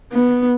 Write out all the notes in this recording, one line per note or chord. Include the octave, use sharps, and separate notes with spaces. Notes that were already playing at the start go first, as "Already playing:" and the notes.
B3